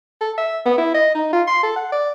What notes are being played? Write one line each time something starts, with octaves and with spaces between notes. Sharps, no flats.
A4
E5
B3
E4
D#5
D#4
F4
C6
A4
F#5
D5